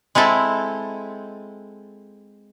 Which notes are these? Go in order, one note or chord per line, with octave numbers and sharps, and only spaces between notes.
G#3 C4 E4 A4